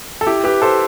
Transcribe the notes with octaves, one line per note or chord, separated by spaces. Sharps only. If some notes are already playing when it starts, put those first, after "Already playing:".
A4
E4 G4
G4 B4
A4 C5